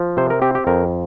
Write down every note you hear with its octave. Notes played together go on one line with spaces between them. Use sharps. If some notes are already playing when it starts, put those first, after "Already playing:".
Already playing: F3
C3 C5
A#4
C4 G4
G4
F2 A#4